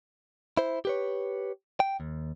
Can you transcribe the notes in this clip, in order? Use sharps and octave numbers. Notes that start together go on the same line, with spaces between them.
E4 C5
G4 B4 C#5
G5
D#2